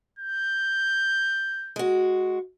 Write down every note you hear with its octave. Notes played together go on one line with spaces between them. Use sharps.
G6
G#3 F#4